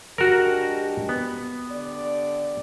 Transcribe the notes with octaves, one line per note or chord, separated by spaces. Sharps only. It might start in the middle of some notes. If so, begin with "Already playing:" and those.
G#3 D4 F#4 G4 A#4
B3
D3 G4 D5